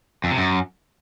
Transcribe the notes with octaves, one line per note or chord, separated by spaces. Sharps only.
F2
C3
F#2